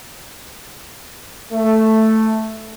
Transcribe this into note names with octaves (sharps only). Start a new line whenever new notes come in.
A3